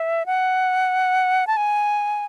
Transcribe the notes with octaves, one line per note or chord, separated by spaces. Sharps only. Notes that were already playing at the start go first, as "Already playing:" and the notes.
Already playing: E5
F#5
A5
G#5